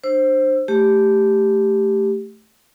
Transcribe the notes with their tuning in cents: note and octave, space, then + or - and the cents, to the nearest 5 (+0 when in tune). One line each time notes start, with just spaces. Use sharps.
D4 +35 C5 +10 E6 +20
A3 +0 G4 +0